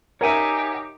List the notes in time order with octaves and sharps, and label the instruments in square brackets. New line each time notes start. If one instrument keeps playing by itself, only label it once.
[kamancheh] D#4 G4 [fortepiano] A#4 E5 [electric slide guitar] C#5 F#5 G#5